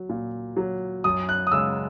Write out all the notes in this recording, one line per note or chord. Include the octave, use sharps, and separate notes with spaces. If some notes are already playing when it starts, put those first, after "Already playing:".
Already playing: F#3
A#2
F#3
F#2 D#6
F#6
D#6
C#3 G#3 E6